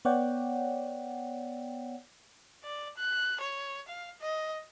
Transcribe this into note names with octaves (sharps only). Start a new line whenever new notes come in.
B3 C#5 D5 F#5 G5
D5
F#6
C#5
F5
D#5